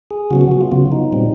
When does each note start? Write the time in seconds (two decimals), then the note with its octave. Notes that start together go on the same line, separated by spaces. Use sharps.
0.11 G#4
0.30 C#3 F#3 B3 F#4
0.41 F#4
0.51 F#4
0.61 F4
0.71 C#3 F#3 B3 F4
0.92 D#4
1.12 A#2 G3 C4